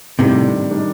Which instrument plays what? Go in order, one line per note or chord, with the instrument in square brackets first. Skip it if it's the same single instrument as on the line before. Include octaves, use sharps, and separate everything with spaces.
[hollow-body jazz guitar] A2 C3 [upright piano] D#3 G3 D4
[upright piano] D#3 G3 D4